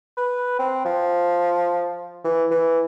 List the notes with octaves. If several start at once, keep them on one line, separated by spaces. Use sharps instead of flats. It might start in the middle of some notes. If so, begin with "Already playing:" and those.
B4
C4
F3
E3
E3